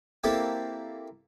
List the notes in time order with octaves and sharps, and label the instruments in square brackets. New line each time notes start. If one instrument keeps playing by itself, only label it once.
[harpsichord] A#3 C4 E4 G4 A4